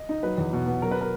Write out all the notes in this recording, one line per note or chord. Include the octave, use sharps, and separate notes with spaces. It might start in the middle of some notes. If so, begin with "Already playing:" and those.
Already playing: D#5
D#4
F#3 B4
E2
B2
B3
F#3 A#4
B4
A#4